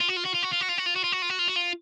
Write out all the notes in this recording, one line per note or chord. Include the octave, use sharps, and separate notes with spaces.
F4
F#4
F4
F#4
F4
F#4
F4
F#4
F4
F#4
F4
F#4
F4
F#4
F4
F#4
F4
F#4
F4